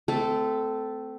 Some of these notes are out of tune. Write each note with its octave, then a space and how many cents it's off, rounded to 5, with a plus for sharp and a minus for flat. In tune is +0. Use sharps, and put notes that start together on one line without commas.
A3 +0 C4 -25 A4 +0